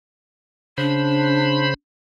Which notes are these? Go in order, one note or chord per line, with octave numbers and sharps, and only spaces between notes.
C#3 D4 C5 B5